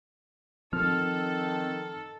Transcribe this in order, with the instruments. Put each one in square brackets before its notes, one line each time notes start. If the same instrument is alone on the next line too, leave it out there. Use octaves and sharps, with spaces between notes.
[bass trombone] D#3 [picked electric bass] F3 C4 [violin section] A4 [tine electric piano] F6